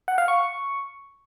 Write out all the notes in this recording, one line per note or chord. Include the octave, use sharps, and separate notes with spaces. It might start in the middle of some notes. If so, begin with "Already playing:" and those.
F#5
F5
C#6